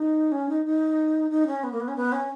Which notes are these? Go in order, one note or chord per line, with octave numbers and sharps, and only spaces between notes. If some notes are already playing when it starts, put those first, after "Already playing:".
Already playing: D#4
C#4
D#4
D#4
D#4
C#4
B3
A#3
B3
C#4
B3
C#4